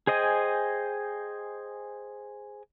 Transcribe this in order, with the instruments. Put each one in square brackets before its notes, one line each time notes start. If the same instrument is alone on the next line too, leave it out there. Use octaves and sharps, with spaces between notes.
[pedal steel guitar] G#4 C5 D#5 G5 G#5